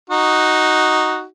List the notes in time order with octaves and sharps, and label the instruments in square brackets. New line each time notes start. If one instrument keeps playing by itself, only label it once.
[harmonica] D#4 F#4